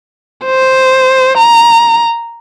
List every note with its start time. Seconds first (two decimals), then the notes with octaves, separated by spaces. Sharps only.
0.46 C5
1.38 A#5